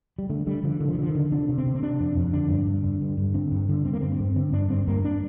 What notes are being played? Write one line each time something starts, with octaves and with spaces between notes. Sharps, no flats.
G3
D3 A3
D3 G3
D3 F3
D3 D#3
F3
D#3
D3 F3
D#3
D3
C3 D4
C3
C4
C3
C4
C3 D4
F2
F2
D3 D4
G2
G2
D3
G2
G2
D3 C4
G2
D3
D3 C4
A#3
G2 C4
C4
G2
D3 C4
G2 D4
G2 C4
G2 A#3
D4